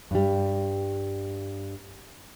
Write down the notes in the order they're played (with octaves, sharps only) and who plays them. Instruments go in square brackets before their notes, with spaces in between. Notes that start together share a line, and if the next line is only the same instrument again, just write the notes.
[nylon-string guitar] G2 G3